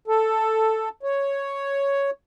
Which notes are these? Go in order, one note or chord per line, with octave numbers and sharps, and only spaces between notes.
A4
C#5